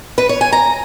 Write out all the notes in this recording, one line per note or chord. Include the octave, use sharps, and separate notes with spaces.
B4
C#5
G#5
A#5